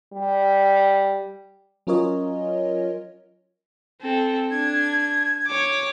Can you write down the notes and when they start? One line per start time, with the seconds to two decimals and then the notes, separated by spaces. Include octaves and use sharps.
0.13 G3
1.87 F#3 C#4 F4 A#4 C#5 D#5
4.01 C4 A4
4.51 D4 G#6
5.47 C#5 D6